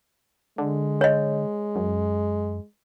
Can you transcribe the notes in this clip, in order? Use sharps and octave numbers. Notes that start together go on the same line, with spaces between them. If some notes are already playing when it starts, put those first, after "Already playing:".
D3 G#3
C#5 D#5
F#2